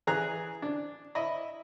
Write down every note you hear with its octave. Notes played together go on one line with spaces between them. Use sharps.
E3 G#4 A#5 F#6
D4
E4 D#5 B5